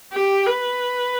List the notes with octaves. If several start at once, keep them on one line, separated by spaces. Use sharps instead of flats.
G4
B4